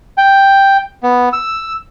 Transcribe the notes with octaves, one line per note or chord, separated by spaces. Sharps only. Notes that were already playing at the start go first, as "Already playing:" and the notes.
G5
B3
E6